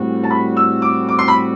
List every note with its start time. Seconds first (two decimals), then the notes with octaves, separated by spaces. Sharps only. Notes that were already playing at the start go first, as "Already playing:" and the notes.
Already playing: A2 G3 C4 F#4
0.24 A5
0.30 B5
0.57 E6
0.82 D6
1.09 D6
1.19 C6
1.28 B5